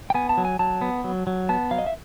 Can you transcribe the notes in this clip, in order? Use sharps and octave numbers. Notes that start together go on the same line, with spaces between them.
G5
B3 G#5
A5
F#3
G#5
F#3 A5
B3
F#3
F#3
B3 A5
F#3 F5
D#5
E5